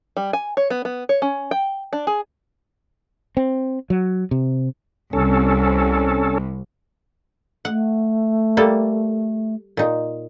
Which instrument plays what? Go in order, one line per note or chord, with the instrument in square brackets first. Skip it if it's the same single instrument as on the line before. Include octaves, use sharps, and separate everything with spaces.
[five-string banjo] G3
G#5
C#5
B3
B3
C#5
C#4
G5
D4
G#4
[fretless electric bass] C4
F#3
C3
[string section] C2 [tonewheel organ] C#4 A4
[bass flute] A3 [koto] F#5
[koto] G3 A#3 A4
A#2 D#4